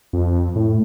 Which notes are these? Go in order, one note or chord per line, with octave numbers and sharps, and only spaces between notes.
F2
A2